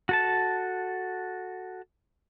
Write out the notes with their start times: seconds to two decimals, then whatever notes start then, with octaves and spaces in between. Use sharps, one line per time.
0.09 F#4 A4 A5